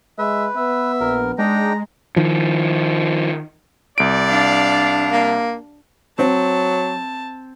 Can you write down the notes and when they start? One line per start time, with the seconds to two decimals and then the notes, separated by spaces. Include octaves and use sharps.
0.18 G#3 B4 E5
0.56 B3 E5
1.00 A#1 A#4
1.38 G#3 D4 D#4 G5 A#5
2.16 D#3 F3
3.98 C2 D5 D7
4.29 D4 F5
5.12 A#3
6.19 F#3 C4 C5 A5